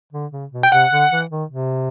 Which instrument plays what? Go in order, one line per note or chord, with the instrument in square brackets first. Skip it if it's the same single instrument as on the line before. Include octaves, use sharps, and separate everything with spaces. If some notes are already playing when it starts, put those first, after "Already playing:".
[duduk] D3
C#3
B2
[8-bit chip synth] G5
[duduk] C3 [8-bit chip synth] F#5
[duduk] D3
E3
D#3
C3